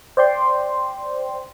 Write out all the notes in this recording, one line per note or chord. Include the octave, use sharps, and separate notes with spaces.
C5 D5 G5 C6